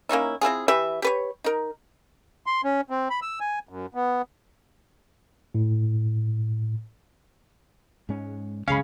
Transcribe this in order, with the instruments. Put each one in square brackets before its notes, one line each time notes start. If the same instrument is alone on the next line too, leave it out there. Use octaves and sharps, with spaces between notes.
[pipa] A#3 C#4 D#4 E4
C4 E4 F4 G#4
E3 G4 B4 E5
G4 B4 C#5
D#4 A#4
[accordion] C6
C#4
C4
B5
E6
G#5
F#2
B3
[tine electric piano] A2
[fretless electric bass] G#2 G#3 C#4
[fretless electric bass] C2 F#2 G#3 [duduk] C#3 [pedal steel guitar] C#4 [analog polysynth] F5 B5